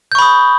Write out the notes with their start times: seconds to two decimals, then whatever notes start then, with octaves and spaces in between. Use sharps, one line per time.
0.12 G6
0.15 C#6
0.19 B5
0.22 D#6